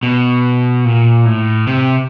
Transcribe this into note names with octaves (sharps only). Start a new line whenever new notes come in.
B2
A#2
A2
C3